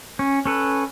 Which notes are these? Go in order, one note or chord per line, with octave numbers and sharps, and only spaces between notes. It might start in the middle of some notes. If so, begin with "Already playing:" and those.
C#4
C#4 A4 B4